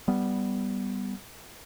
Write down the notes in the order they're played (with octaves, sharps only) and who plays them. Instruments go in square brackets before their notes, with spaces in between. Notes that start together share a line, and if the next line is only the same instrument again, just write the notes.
[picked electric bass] G3 B3